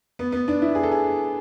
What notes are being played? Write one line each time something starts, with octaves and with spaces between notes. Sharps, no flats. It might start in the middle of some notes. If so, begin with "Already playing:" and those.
B3
B3
D4
E4
G#4
A4
G#4